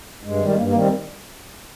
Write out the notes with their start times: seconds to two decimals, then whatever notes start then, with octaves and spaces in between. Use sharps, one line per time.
0.23 G2 G#3
0.40 D#3 G3
0.48 G#3
0.55 G2 A#3
0.67 A#3
0.72 D#3 G3 C4